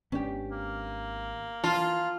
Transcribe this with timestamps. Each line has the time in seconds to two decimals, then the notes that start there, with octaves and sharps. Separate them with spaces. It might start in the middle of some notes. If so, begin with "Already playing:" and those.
0.12 G#1 B3 C#4 D4 G4
0.51 A#3
1.64 E3 F4 A5